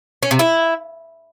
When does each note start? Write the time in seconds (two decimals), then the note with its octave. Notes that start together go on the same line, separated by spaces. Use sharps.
0.23 C#4
0.31 C3
0.39 E4